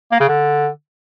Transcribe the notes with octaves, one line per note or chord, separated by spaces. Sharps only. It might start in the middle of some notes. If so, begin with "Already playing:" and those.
A#3
C#3
D3